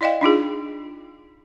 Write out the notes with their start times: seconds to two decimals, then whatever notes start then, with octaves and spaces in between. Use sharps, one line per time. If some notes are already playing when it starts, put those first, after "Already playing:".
0.01 E4 D5 D#5 F5 G5
0.21 D4 D#4 F4 G#4